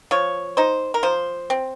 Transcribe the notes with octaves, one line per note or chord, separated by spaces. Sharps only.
F3 C#5
D#4 C5
A#4
F3 C5
C4